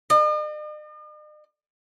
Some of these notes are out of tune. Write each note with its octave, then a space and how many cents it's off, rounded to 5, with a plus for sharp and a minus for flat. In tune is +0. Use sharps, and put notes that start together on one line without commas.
D#5 -45